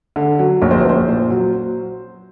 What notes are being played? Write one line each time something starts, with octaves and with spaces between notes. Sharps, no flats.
D3
F#3
A#1 C#5
C5
B4
A#1 C5
A#2
F#3